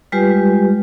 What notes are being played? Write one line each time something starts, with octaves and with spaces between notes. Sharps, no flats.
G3 G#3 F4 G4 B4